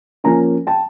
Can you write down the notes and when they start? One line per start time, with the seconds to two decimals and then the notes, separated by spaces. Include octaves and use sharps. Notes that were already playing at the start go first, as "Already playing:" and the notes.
0.24 F3 A#3 C#4 G#5 A#5
0.67 G5 A5